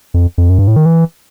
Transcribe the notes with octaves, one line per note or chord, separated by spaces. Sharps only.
F2
F2
F#2
G2
A2
D#3
E3